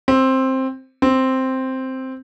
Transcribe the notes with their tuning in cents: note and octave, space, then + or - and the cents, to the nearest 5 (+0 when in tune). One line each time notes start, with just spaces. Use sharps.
C4 +10
C4 +0